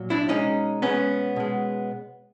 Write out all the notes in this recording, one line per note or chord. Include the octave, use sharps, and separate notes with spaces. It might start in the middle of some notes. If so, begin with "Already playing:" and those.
Already playing: A#2 F#3
D4 E4
B2 G#3 C#4 D#4
B2 G#3 B3 C#4
B2 G#3